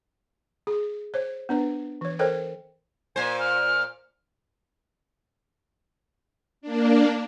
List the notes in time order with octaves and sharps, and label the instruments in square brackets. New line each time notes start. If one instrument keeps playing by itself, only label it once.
[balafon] G#4
C5 C#5
B3 D4 B4
E3 C#5
A4 A#4 C5 C#5 D#5 G5
[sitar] A#2 C5 [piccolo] G#5
[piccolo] F6
[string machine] A#3 D4